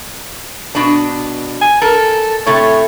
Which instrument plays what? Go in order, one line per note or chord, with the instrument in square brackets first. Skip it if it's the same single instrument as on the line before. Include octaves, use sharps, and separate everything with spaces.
[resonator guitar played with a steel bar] B2 D4
[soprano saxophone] G#5
[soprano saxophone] A4 [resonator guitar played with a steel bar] A#4
[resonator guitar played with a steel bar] A2 C3 A3 [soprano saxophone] C#5